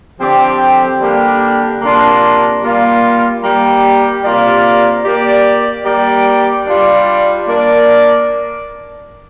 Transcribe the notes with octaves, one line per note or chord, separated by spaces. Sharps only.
D3 F3 C4 G4 D5
D3 G3 A#3 D4 G4
C3 A#3 D4 F4
G3 A#3 F4
G3 A#3 G4
C3 A#3 F4 D5
A#3 G4 D5
G3 A#3 G4 D5
G3 D4 F4 D5
A#3 D4 A#4 D5